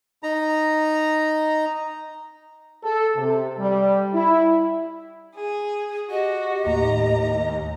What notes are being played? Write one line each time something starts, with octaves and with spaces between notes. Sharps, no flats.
D#4 A#5
A4
C3
G3
E4
G#4
F#4 G4 D#5
D#2 A2 A#5